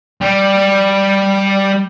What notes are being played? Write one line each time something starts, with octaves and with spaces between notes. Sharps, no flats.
G3